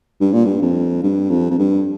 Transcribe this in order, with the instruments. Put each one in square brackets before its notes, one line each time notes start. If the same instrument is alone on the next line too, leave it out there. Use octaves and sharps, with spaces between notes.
[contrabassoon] G2
A#2
G2
F2
G2
F2
F2
G2